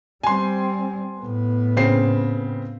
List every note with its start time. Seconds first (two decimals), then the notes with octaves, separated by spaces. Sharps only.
0.23 G3 C4 G#5 C6
1.18 A2 B3
1.77 C#3 C4 C7